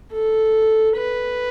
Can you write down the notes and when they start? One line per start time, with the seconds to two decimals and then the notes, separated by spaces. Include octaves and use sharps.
0.13 A4
0.97 B4